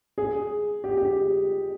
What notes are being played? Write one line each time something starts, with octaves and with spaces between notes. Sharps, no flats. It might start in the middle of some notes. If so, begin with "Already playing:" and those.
G#4
G4
G4